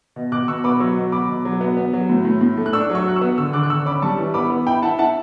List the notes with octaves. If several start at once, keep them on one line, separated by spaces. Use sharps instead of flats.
B2
B2 D6 F#6
B2 C#6 E6
B3 B5 D6
F#3 C#6 E6
B2
F#3 B5 D6
B2
F#3
B3
B3
F#3
A2
A2
A2
A3
F#6
D4 C#6 E6
F#3
C#6 E6
F#3 F#6
C#6 E6
B3
D3 C#6 E6
D3 D6 F#6
F#6
D3 C#6 E6
C#4 B5 D6
G3 A5 C#6
E3
B3 B5 D6
B3
E4 G5 B5
E4 F#5 A5
E4 F#5 A5